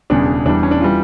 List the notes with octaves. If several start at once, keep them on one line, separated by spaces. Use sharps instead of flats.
E1 E2 C#3 G3 D4
E2 E3 G3 D4
C#4
D4
E3 G3 F4